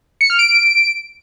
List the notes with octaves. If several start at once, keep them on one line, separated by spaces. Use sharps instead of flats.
C#7
F6
D7